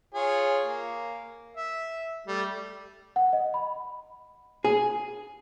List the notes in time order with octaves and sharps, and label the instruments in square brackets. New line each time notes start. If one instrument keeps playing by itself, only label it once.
[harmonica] F4 G#4 C#5
A#3
E5
G3 A3
[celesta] F#5
D#5
B5
[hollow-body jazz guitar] G#4